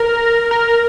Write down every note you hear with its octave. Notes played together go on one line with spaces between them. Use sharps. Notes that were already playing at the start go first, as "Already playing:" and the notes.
Already playing: A#4
A#4